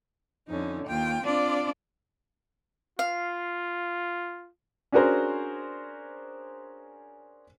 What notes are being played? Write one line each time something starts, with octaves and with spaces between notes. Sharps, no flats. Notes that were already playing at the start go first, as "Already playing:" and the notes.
F2 D3 C#4 D#4
D#2 F4 G5
C4 D4 F4 D5
F4 F5
C#4 D4 F#4 G#4 A#4 C5